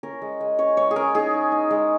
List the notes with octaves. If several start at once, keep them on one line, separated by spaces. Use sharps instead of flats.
C#4 A#4
G#3
G#3
C#4 C#5
G#3 C#5
G#4
C#4 A#4
D#4 G#4
D#4
D#4
G#3